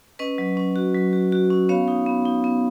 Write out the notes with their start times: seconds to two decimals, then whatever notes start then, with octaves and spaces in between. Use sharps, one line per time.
0.19 C#4 B4 D#5
0.38 F#3
0.57 C#4
0.76 F#4
0.94 F#3
1.13 F#4
1.32 F#4
1.51 C#4
1.69 B3 C#5 F5
1.88 D#4
2.06 B3
2.26 D#4
2.44 B3